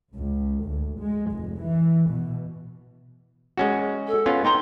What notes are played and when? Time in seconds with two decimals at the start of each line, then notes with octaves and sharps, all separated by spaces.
0.14 C#2
0.64 D2
1.00 G#3
1.33 F1
1.62 E3
2.10 B2
3.57 G#3 C#4 F#4
4.07 A4
4.26 B3 C#4 F4
4.45 D#4 G5 A#5 C6